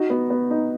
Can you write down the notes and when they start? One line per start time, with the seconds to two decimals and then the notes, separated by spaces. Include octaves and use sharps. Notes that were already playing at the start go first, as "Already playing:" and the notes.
Already playing: D#4 F#4
0.10 B3
0.30 B3
0.51 D#4